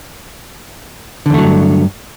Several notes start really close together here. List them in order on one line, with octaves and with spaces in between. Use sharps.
D3 E2 A3 F#3 G2